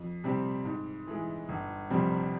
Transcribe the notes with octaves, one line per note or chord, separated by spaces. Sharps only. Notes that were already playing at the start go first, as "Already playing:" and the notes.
Already playing: F2
C3 G3 C4
G#2
E3 G#3
G1
F2 C3 G3 C4